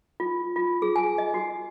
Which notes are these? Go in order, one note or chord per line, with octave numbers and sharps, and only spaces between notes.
F4
F4
G#4
G#5
D#5
F#4